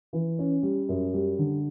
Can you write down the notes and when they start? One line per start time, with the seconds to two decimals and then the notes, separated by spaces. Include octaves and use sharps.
0.13 E3
0.39 C#4
0.63 G3
0.89 F#2
1.14 G3
1.39 D3